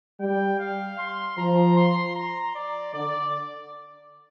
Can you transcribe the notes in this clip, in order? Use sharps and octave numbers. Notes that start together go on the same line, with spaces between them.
G3 G5
F5
C6
F3 A#5
C6
A#5
D5
D3 D5